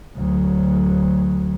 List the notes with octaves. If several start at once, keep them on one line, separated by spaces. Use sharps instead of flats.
D2 F#3